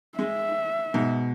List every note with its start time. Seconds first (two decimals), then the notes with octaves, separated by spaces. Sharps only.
0.19 G#3 E5
0.94 G#2 B2